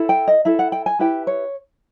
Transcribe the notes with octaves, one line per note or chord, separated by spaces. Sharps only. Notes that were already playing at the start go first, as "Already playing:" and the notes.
Already playing: E4 A4
G5
D#5
E4 A4 E5
F#5
G5
G#5
E4 G4 B4 G5
C#5